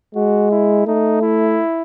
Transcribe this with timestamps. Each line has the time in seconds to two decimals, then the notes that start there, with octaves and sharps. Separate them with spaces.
0.15 G#3 F#4
0.51 E4
0.87 A3 D#4
1.22 E4